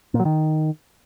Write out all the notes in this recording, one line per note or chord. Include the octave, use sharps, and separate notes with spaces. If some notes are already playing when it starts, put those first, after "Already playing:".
A#2
F#3
D#3